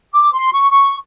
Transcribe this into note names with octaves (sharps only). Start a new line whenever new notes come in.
D6
C6
C#6
C#6